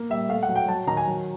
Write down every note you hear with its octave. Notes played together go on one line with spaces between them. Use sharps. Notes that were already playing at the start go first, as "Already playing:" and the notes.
Already playing: A#3
G3 E5
A3 F5
F#5
F#3
G5
F#3 A5
D#3 A#5
G#5
F#3